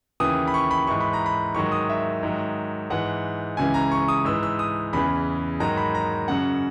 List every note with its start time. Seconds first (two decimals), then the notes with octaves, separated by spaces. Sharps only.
0.20 D#2 C#3 E3 D#6
0.48 B5
0.54 C#6
0.71 B5
0.87 G#2 E3 C#6
1.01 B5
1.13 A#5
1.26 B5
1.55 G#2 D#3 F#3 C#6
1.72 D#6
1.89 E5
2.23 G#2 D#3 F#3
2.90 G#2 E3 F#5
3.57 C#2 C#3 E3 G#5
3.74 A#5
3.92 C#6
4.08 D#6
4.25 G#2 E3 E6
4.43 E6
4.59 D#6
4.93 E2 C#3 E3 B5
5.60 G#2 D#3 F#3 A#5
5.77 B5
5.95 A#5
6.28 F#2 C#3 F#3 F#5